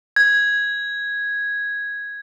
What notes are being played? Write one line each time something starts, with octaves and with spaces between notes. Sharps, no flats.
G#6